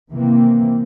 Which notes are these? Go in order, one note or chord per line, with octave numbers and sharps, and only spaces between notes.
C3 D#3 E3 A#3 C4